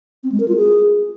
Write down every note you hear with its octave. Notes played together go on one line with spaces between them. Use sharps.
C4
G#3
A#4
F4
G#4